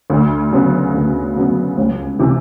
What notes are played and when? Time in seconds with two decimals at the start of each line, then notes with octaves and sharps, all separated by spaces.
0.10 D2
0.52 C#3 F#3 B3
0.94 D2
1.36 C#3 F#3 B3
1.78 C#2
2.19 C3 E3